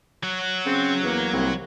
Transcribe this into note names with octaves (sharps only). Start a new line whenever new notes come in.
F#3 F#4
C#3 C4
E2 A#3
C2